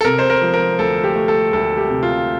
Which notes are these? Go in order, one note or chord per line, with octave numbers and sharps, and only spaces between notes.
A4
C3 A#4
C5
A#4
F3
A#4
D2 A4
G4
A3
A4
D2 A4
G4
C3
F4